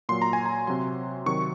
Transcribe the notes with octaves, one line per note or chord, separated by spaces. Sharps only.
A#2 F#3 C6
A#5
G#5
A#5
C3 F#3 C6
C3 D#3 F#3 C#6